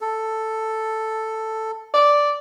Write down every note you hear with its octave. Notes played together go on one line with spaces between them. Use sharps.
A4
D5